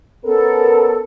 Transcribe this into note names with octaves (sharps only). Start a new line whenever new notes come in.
B3 C#4 A4 A#4